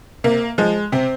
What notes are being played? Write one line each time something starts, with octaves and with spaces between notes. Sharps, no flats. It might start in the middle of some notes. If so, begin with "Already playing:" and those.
C3 A#3
F3 G#3
C3 C4